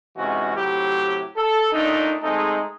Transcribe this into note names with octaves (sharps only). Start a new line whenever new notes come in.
G#2 C3 E3 G#3 C#4 F#4
A2 C3 F#3 E4 G4
A4
A#2 A3 D4 D#4
G#3 A3 C4 D#4 G#4 A4